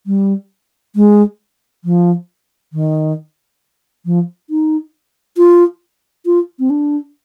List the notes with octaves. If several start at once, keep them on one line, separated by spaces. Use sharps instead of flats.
G3
G#3
F3
D#3
F3
D#4
F4
F4
C4
D4